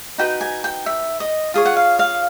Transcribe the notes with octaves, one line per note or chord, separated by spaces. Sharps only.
D#4 F#4 B4 G5
G#5
G5
E5
D#5
F4 G#4 C#5
F#5
F5
F5